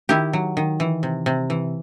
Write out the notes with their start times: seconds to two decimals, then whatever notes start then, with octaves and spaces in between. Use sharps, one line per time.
0.09 D#3 E4 G4
0.33 F#3
0.57 D#3
0.80 E3
1.03 C3
1.26 C3
1.50 E3